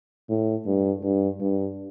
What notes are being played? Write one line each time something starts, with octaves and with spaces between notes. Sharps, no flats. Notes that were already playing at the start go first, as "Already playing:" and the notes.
A2
G2
G2
G2